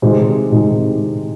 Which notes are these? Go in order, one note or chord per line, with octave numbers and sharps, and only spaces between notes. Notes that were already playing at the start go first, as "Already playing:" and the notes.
C3 D#3 G#3 C5
C3 D#3 G#3